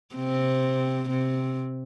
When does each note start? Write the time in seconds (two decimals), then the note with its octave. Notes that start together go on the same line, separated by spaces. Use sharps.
0.15 C3 C4
1.09 C3 C4